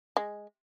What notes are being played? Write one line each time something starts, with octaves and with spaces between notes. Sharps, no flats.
G#3